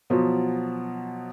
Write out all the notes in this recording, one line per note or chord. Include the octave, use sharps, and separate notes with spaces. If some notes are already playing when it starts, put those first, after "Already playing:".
B2 F3 F#3